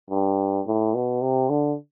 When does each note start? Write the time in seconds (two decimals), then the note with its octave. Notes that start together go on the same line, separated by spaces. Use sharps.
0.10 G2
0.67 A2
0.95 B2
1.22 C3
1.50 D3